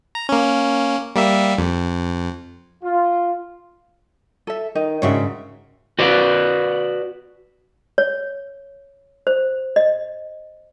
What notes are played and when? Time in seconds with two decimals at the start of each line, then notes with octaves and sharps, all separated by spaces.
0.15 A#5
0.29 A#3 C#4
1.16 G3 A#3 E5
1.58 F2
2.84 F4
4.47 A4 E5
4.75 D#3 D#4
5.02 G#2 C#3 D4 F#4 C#5 E5
5.99 F#4 B4 D5
7.98 C#5
9.27 C5
9.76 D#5